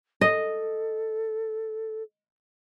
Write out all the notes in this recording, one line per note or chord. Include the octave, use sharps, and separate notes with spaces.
A4 D#5